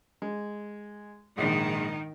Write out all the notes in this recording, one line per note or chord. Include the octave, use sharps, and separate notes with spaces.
G#3
A#1 G#2 D#3